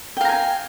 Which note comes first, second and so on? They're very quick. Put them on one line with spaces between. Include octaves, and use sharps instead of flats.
G5 F5 A#5 G#5